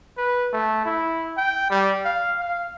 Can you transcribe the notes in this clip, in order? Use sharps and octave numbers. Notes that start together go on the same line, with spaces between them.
B4
A3
E4
G5
G3
F5
F5